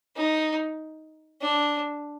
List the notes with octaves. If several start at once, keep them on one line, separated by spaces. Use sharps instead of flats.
D#4
D4